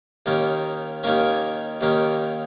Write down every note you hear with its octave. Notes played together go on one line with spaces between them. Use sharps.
D#2 D#3 A#3 C#4
D#2 D#3 A#3 C#4 G#5
G#5
D#2 D#3 A#3 C#4